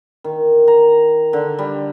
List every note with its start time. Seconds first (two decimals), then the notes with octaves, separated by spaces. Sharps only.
0.24 D#3
0.68 A#5
1.33 D3
1.59 G3